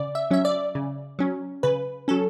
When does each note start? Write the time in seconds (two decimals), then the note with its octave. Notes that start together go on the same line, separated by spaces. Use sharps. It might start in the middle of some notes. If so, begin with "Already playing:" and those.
Already playing: C#3 D5
0.15 E5
0.31 F#3 C#4 E5
0.45 D5
0.75 C#3
1.19 F#3 C#4
1.63 C#3 B4
2.08 F#3 C#4 A4